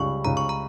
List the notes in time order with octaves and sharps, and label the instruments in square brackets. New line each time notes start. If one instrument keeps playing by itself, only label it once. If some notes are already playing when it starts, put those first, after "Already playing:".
Already playing: [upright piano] C#2 G3 [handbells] C#6
[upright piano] C#2 [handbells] A#5
[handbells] C#6
A#5